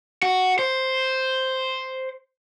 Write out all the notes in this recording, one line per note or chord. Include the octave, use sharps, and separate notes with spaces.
F#4
C5